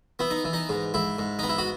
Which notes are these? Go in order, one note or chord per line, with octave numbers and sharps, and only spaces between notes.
B3 E4
D#4
E3
D#4
G#2
G#2 E4
G#2
B3 D#4
E4
F#4